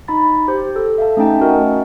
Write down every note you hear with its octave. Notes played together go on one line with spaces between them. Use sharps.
D#4 B5 A6
G4 C5
A4
E5 F5 A5
A3 C#4 D#4 E5 G5 A5
C#4 F#4 A#4 D#5 F#5